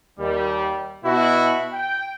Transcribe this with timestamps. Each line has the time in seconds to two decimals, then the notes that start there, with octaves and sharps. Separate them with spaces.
0.19 D#2 G3
1.04 B2 E4 F#4
1.73 G5